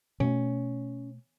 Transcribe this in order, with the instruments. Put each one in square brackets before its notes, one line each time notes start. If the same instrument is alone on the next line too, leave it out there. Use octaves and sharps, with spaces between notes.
[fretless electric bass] B2 A3 [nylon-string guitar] C#4